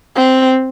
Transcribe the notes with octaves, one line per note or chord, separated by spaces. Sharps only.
C4